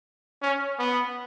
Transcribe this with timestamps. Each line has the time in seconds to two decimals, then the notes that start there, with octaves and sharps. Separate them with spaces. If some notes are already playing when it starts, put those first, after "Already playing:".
0.42 C#4
0.79 B3